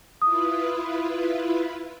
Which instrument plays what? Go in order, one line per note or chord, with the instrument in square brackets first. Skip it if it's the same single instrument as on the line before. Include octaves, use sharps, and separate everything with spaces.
[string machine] E4 F4 B4 [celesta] D#6